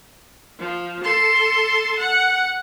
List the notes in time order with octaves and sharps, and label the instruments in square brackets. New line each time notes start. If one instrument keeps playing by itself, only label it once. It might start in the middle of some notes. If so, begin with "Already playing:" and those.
[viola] F3
A4 C6
F#5